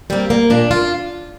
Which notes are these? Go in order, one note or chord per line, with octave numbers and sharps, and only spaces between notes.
G3 A#3 C4
A#3
A#2 D4
F4